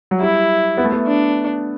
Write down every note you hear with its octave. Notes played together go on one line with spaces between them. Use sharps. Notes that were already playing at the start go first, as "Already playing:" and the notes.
F#3
G3 E4
B3
A3
B3
D4